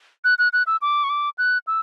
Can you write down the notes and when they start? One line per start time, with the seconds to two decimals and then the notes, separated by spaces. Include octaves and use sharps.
0.24 F#6
0.38 F#6
0.53 F#6
0.67 E6
0.82 D6
1.04 C#6
1.10 D6
1.38 F#6
1.67 E6